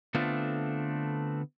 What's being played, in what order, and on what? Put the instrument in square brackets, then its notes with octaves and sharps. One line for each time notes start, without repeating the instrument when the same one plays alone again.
[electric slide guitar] D3 A3 B3 C4 D4 F4